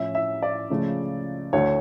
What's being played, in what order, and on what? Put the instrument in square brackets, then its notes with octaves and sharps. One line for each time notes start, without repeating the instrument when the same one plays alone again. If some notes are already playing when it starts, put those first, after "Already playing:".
Already playing: [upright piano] A2 F3 C#4 E5
E5
D5
C#2 C#3 F3 A3
D2 D3 A3 C#5